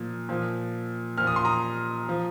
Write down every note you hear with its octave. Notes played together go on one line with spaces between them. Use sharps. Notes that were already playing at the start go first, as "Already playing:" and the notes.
Already playing: A#2 F3
A#2 F3
A#2 F3 F6
D#6
C6
A#5 D#6
F3